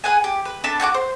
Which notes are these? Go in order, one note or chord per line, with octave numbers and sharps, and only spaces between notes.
G#4 B4 F#5 G#5
G4
B4
D4 A4 A5 B5
F#4 F#5 G#5 D6
C5